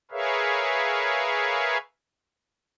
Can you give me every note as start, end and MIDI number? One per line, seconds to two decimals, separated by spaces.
0.11 1.78 68
0.11 1.78 70
0.11 1.78 71
0.11 1.78 73
0.11 1.78 76
0.11 1.78 77